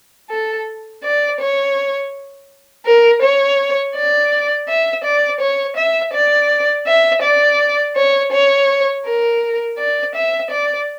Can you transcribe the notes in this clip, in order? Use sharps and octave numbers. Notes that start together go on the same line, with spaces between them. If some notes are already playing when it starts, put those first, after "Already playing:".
A4
D5
C#5
A#4
C#5
D5
E5
D5
C#5
E5
D5
E5
D5
C#5
C#5
A#4
D5
E5
D5